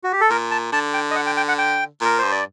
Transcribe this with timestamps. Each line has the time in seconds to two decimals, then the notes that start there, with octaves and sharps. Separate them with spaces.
0.04 F#4
0.12 G4
0.21 A4
0.30 A#2 A#4
0.51 A5
0.72 D3 A5
0.94 G5
1.11 D#5
1.16 F#5
1.26 G5
1.37 G5
1.48 F#5
1.58 G5
2.01 A#2 A#4
2.18 G2 C5
2.31 D5